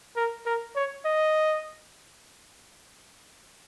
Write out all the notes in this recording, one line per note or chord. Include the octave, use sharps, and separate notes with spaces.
A#4
A#4
C#5
D#5